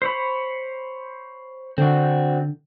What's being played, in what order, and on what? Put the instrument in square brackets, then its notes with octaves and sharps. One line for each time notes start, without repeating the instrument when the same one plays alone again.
[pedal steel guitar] C5 C#5 B5
[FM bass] D3 [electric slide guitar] C4 D4 F#4